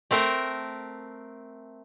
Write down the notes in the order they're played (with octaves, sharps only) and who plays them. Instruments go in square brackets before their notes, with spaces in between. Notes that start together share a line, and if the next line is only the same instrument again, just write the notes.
[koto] A3 C4 A#4